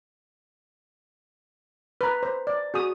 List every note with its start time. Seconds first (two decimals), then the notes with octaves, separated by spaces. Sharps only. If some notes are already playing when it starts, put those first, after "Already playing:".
2.01 B4 A#5
2.23 C5
2.47 D5
2.74 F#4 G#4 D#6